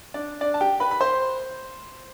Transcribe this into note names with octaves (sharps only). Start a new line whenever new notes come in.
D4 D5
D4 D5
A5
G4 G5
B4 B5
B5
C5 C6